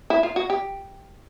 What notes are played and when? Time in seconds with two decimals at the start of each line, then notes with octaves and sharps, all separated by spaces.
0.10 E4
0.23 F4
0.36 F#4
0.50 G4